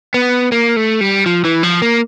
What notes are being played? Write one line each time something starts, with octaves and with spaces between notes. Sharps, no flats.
B3
A#3
A3
G3
F3
E3
F3
A#3